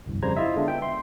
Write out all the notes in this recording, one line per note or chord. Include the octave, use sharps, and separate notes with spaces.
G1 C2 F2
F2 C#3 G3 C5 A#5 G#6
E4 F4 D#5 E5
D3 G#3 B3 D4 F4
B3 E5 G5
C6